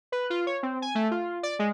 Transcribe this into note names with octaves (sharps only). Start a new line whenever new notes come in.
B4
F4
C#5
C4
G#5
A3
F4
D5
G#3